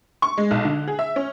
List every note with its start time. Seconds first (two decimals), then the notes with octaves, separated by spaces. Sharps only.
0.22 C#6
0.38 G#3
0.51 B1
0.65 D3
0.88 G#4
0.99 E5
1.16 C#4